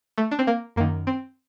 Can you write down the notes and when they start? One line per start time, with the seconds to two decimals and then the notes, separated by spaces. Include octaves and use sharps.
0.18 A3
0.31 D4
0.39 C4
0.47 A#3
0.76 F#2 D#3 A#3
1.07 C4